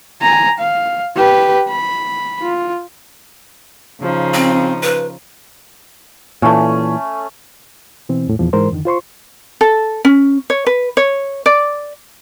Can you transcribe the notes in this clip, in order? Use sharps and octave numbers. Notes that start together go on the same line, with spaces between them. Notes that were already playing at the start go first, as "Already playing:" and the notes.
G#5 A#5
F5
G4 B4
B5
F4
C#3 F3 D#4
C4
B4
A#2 E3 A3 C#4
B2 E3 C4
E2 A2
E2 A#2 F3
G#2 E3 G#3 A#4 C5 C6
F2 D3 D#3
F4 C5 C6 C#6
A4
C#4
C#5
B4
C#5
D5